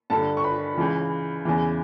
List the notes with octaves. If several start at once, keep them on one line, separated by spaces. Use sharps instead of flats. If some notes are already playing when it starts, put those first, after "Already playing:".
G2 D3 A4 A5
C#6
B4 B5
C#2 C#3 E3
E2 C#3 E3